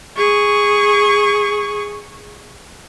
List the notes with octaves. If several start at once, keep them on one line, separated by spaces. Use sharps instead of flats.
G#4 C#6